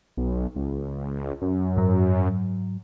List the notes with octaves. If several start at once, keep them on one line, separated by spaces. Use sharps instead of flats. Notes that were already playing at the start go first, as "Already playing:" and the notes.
B1
C#2
F#2
G#2 F#3